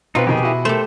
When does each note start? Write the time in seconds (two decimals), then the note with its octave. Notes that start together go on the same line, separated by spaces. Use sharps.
0.15 B2 B3 C4 D#4 F4 B4
0.27 F2 D#3 G4 G#4
0.43 E4 F#4
0.65 A3 G4 A4 C5